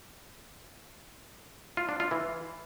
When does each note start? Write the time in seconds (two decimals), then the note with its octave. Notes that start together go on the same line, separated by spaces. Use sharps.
1.77 F4
1.89 D4
2.00 F4
2.11 E3